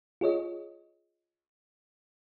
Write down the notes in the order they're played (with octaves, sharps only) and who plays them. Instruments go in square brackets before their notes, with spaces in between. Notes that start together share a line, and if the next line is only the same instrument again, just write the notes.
[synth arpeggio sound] F4 G#4 C#5 D#5